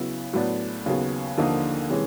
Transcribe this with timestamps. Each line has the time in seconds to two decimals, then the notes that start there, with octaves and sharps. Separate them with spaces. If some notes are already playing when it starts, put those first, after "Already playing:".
Already playing: C#3 F#3 B3 E4
0.33 A2 F#3 B3 D4
0.85 D#2 C#3 F#3 B3
1.37 D#2 D3 F3 A#3 D#4
1.90 C3 E3 G#3 C#4